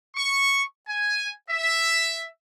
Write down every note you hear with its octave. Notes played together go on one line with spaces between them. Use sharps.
C#6
G#5
E5